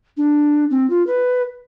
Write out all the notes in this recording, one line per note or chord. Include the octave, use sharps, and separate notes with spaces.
D4
C4
F4
B4